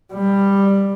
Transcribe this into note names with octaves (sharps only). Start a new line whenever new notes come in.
G3